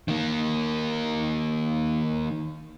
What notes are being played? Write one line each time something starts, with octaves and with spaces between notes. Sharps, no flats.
D#3 A#3